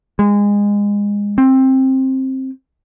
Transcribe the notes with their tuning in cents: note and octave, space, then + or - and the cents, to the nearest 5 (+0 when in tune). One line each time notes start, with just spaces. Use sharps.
G#3 -25
C4 +15